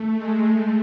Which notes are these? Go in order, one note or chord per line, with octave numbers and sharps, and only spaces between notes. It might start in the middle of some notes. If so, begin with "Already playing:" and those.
Already playing: A3
G#3
A3